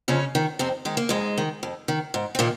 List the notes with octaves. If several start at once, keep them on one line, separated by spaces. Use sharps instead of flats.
F2 C#3 C#4
D#3
F2 C3 C4
D#3 G#3
A#3
F2 G#2 G#3
D#3
F2
D#3
G#2
C4
A#2 D#3 A#3